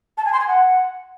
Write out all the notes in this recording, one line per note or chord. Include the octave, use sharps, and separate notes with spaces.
A5
G#5
C6
G#5
F#5